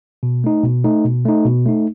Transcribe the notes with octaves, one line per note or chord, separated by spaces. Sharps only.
B2
A3 D#4
B2
A3 D#4
B2
A3 D#4
B2
A3 D#4